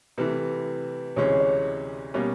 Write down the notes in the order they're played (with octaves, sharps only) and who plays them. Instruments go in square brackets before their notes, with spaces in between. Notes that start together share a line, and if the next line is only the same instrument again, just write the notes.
[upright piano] C3 E3 A3 [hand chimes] B4
[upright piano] D2 C3 E3 G#3 C#4 [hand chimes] C#5
[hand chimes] D5
[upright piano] B2 G3 A#3 C#4 [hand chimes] D5